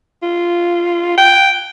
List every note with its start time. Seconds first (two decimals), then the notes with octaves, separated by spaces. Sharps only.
0.22 F4
1.18 G5